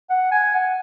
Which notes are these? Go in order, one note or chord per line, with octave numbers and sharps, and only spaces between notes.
F#5
G#5
F#5